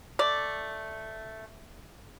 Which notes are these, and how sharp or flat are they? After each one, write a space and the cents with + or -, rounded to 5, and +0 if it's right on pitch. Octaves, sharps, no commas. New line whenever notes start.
A3 +0 D5 +0